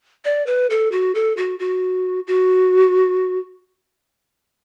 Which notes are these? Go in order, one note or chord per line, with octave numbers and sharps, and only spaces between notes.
D5
B4
A4
F#4
A4
F#4
F#4
F#4